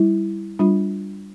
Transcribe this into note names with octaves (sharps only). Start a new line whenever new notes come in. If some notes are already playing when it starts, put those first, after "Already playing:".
Already playing: G3 E4
G3 D4 F4